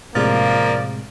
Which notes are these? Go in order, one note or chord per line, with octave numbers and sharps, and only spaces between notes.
A2 C3 F3 G#3 A#3 D5